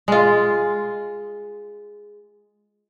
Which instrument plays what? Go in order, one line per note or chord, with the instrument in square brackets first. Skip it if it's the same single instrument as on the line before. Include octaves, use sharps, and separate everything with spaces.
[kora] G#3 F4